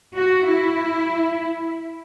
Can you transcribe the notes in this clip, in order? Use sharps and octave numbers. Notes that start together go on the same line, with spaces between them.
F#4
E4